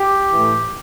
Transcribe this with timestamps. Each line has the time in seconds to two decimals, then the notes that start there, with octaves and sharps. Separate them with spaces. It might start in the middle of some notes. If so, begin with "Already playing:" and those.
Already playing: G4
0.31 A2 E3